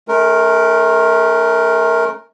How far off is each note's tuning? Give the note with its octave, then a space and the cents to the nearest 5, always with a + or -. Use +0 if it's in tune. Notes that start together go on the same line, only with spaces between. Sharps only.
A3 -30 C#4 +5 A#4 +0